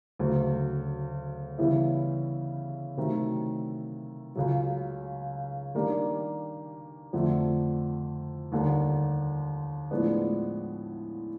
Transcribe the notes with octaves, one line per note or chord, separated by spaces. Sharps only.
D2 C#3 F#3
C#3 E3 G3 B3 E4
C3 D#3 F#3 A3
C#2 C#3 F#3
D#3 G3 A#3 D4 G4
F2 D3 F3 A3
D#2 D3 G3 A#3
A2 F3 G#3 B3 D4